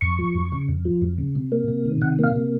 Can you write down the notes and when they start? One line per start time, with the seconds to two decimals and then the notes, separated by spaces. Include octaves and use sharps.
0.01 F2 C#6
0.19 F3
0.35 F2
0.52 C#3
0.69 F2
0.85 F3
1.02 F2
1.18 C#3
1.35 C3
1.52 A#3
1.68 C3
1.85 D#3
2.01 C3 F#5
2.19 A#3 F5
2.36 C3